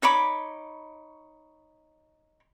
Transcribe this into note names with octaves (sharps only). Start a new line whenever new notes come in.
D#4 C#5 B5 D6